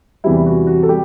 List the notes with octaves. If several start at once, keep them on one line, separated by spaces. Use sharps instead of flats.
E2 C3 E3 G3 E4
F#4
F#4
A4
G3 G4